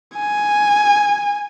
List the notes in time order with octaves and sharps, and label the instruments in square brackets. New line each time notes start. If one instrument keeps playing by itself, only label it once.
[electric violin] G#5